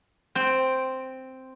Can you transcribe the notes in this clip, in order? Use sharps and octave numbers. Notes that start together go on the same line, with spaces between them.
C4 G5